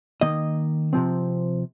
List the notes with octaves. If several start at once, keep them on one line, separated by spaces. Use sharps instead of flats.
D#3 A#3 D#5
C3 F3 C4